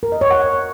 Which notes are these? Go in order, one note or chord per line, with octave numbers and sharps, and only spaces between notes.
A#4
D#5
C#5
F#5